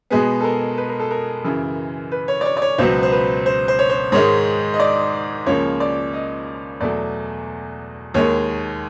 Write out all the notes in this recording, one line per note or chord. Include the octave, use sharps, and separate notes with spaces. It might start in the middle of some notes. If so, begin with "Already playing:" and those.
B2 G#3 B3 G#4
A4
A#4
B4
A#4
A4
A#4
F#2 C#3 E3
B4
C#5
D5
C#5
D5
C#5
C#2 B2 F#3 B3 C5
C5
B4
C5
C5
C#5
C5
G#2 D#3 G#3 C#5
D#5
D5
C#2 C#3 F3 A#3 C#5
D5
D#5
E2 B2 F#3 A3 D5
D#2 D#3 G#3 C#5